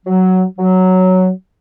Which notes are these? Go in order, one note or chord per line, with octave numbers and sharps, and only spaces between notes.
F#3
F#3